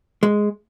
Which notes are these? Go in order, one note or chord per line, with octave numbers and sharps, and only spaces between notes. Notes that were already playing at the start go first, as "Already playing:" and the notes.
G#3